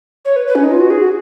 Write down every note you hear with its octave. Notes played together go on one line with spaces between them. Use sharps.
C#5
B4
B4
C#4
D#4
F4
F#4
G#4
F#4